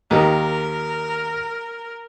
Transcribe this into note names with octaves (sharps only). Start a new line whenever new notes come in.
D#2 D#3 A#4